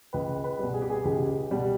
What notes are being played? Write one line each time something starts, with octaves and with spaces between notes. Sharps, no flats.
C#2 B4
B4
B2 G3
G#4
G4
G#4
C#2 G4
B2 G3